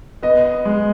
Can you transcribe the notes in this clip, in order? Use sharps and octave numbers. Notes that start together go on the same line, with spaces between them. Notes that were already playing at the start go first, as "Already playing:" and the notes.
B3 D#5
G#3